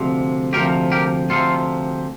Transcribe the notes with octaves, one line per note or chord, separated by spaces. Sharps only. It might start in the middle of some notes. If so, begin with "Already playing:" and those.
Already playing: D2 C3 F3
D2 C3 F3 G4 A#4
G4 A#4
D2 C3 F3 F4 A4